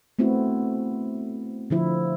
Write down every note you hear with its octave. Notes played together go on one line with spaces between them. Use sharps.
A3 B3 C4 E4 F#4
D3 F3 E4